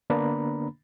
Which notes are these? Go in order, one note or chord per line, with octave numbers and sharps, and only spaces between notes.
D3 A#3 B3 D4 A#5 B5